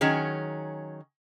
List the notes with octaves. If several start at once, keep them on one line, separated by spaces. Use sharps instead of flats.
D#3 F#3 C#4 G#4